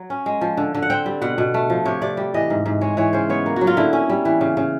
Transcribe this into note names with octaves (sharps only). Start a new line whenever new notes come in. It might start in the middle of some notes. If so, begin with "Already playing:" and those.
Already playing: F#3
C#4
G#3
F3
D3
D3
F#5
C4 G5
G3
B2 F#5
B2
A3
F3
C3 C#5
C3 D5
G3
E3 D#5
G#2
G#2
G#3 C#5
E3 C#5
C#3 C5
B3 C#5
A#3
F#3 F#4
F4
D3 E4
C#4
G3
E3
C#3
C#3